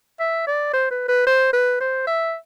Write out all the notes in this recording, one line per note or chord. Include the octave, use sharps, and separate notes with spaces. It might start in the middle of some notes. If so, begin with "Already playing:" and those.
E5
D5
C5
B4
B4
C5
B4
C5
E5